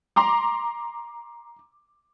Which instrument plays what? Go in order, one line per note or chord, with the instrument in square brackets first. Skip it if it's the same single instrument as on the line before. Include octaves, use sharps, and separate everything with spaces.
[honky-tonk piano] A#5 C6 D6